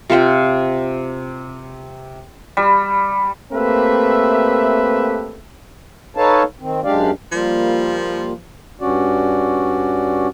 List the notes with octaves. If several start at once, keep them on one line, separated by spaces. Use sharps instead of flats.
C3 F4 C5 G5
G3
A3 A#3 C4 G4 B4 E5
D#4 A4 B4 C#5 F5 A5
D#3 C4
F#2 G#3 D4 G4 D5 F5
F3 G3 A#3 F4
G2 C#4 F#4 D5